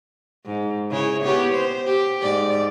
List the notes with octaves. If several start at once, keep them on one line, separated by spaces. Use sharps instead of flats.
G#2
C#3 E4 C#5
B3 G4 C#5
C5
G4
G#2 D5